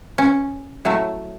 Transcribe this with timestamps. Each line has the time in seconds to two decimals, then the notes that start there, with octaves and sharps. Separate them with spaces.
0.18 C#4
0.85 A2 F#3 A3